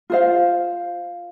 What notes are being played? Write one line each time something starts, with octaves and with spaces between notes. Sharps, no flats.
F4 C5 F5